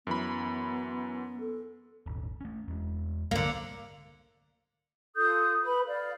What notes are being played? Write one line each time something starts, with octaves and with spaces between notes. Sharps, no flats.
F#2 E3 B3 B5
A4
D#1 G#1
A3 C#4
E2 G#3
C2 D3 F#3 A#3
F4 A4 D#6 G6
B4 B5
D5 F5